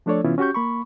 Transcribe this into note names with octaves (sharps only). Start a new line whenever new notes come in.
F3 A3 D4 A4 C#5 D5
C3 E3 B3 C#4 E4 F4
C#4 F#4 G4 C#6 G6
A#3 B5 C#6